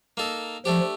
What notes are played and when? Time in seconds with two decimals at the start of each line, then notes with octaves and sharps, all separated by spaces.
0.17 A#3 D#4 A4
0.65 F3 A3 D4 G4